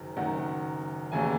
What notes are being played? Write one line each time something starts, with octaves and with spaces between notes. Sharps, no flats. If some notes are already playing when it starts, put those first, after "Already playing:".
Already playing: F#1 F#2 D#3
F#1 F#2 D#3 F#5
E1 D#2 C#3 E3 G#5